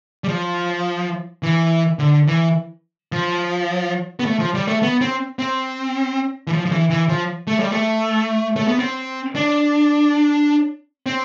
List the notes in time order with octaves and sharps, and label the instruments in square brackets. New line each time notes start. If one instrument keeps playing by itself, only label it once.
[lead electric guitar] G3
F3
E3
D3
E3
F3
B3
A3
F3
G3
A3
B3
C4
C4
E3
F3
F3
E3
E3
F3
A3
G3
A3
A3
B3
C4
D4
C4